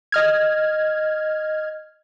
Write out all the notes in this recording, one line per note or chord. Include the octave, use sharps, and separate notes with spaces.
D#5 F6 G#6